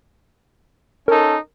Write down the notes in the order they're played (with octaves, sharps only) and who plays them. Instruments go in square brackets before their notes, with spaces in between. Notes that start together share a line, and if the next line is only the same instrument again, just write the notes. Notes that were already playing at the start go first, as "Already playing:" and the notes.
[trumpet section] C#4 D#4 A4 [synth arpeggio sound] A#4